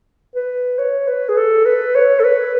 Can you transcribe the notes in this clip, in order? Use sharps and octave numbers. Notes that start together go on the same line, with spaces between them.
B4
C#5
B4
G#4
A4
B4
C#5
A4
B4